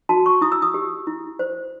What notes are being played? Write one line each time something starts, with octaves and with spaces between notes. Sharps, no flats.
F#4 A5
C#6
E4 D#6
E6
D#6
G4
E4
C5